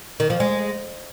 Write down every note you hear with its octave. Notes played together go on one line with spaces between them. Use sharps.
D#3
F3
G#3